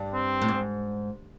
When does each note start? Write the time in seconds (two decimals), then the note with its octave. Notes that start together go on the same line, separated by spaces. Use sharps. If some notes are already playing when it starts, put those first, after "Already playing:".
Already playing: G2
0.14 C4
0.42 A2
0.48 G#2